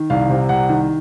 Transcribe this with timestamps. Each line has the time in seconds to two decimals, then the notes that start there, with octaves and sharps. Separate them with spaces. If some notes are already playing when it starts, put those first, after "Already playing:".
Already playing: D#3
0.10 C2 F5
0.30 C3
0.49 C2 F#5
0.69 D#3